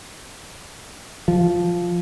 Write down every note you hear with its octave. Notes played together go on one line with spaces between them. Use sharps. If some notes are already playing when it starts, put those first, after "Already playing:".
F3